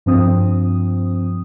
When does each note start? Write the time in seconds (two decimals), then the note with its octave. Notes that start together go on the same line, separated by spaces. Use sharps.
0.06 G2 F3 C4 D#6